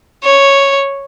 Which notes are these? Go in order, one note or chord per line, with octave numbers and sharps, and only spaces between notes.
C#5